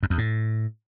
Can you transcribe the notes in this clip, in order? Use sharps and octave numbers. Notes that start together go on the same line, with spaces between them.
F#2
E2
A2